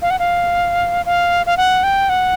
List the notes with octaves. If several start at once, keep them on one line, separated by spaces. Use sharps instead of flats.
F5
F#5
F5
F5
F5
F#5
G5
F#5